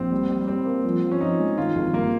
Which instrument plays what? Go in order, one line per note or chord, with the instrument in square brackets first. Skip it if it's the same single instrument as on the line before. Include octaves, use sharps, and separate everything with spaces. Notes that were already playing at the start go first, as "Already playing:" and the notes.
Already playing: [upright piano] A#1 [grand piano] C4
[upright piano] G3
G3
[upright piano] G3 [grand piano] C4
[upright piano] A#3
F3
F3
[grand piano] C#4
[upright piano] F3 [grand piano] D#4
[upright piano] G#3
[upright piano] D#3 [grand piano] F4
[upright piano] G#1
[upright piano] G2 [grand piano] A#3